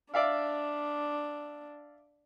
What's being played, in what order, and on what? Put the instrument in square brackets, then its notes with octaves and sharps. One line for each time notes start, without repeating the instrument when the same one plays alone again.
[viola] D4 [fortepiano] D5 E5 F5